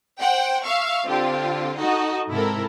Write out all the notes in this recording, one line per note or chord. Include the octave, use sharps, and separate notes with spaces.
C5 F#5 G5
E5 F5 C#6
D3 C4 F4 G4
D#4 F#4 A4 D#5
G#2 C3 E4 A4 A#4